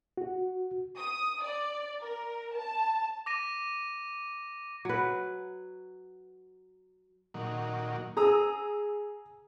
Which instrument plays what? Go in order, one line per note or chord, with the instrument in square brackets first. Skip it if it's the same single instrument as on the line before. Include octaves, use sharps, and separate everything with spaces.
[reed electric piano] F#4
[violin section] D#6
D5
A#4
A5
[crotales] D6 A#6 D#7
[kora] F#3 B4
[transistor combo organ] A#2 D#3 F#3
[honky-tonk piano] G#4 A#5 D#6 E6